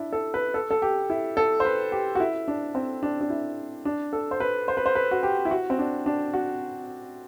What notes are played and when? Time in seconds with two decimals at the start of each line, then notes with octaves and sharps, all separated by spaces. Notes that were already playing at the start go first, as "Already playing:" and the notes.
Already playing: D4 E4
0.13 A4
0.34 B4
0.54 A4
0.71 A4
0.82 G4
1.10 E4
1.37 A4
1.60 C5
1.65 B4
1.92 G4
2.15 F#4
2.20 E4
2.48 D4
2.75 C4
3.03 D4
3.21 D4
3.30 E4
3.85 D4
4.13 A4
4.31 C5
4.40 B4
4.68 C5
4.77 B4
4.86 C5
4.95 B4
5.11 F#4
5.23 G4
5.45 E4
5.51 F#4
5.70 C4
5.79 D4
6.06 D4
6.33 F#4